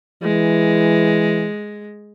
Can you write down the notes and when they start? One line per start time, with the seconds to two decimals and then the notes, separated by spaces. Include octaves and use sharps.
0.22 E3 G#3